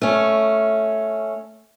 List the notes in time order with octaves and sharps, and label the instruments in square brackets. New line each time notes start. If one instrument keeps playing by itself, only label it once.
[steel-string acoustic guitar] A3 C#4